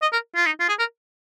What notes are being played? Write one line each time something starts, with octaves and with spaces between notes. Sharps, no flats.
D#5
A#4
F4
D#4
F4
G#4
A#4